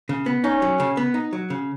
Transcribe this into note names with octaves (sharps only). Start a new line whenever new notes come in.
C#3
B3
C#4 D#4
F#3
C#3
B3
D#4
F#3
C#3